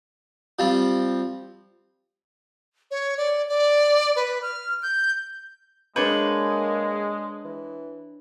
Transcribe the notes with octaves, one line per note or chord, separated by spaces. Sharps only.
F3 G3 C4
C#5
D5
D5
B4
F6
G6
G#3 A#3 D4 B4 C#5 G6
E3